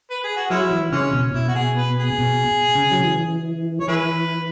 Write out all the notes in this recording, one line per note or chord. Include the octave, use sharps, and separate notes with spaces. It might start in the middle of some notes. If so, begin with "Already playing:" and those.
B4
G#4
F#4
F#3 G#3 C#4 E4
E3
C#3 E3 G#3 C#4
B2
B2 E4
F#4
G#4
B4
G#4
B2
C#3
F#3
E3
C#5
E3 E4 G#4 B4